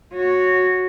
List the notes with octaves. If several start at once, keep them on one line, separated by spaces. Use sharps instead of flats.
F#4 C#5